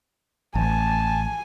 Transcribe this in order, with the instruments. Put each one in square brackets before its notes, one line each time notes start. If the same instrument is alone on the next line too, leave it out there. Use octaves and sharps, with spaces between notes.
[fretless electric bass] A1 [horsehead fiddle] G#5 [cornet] A5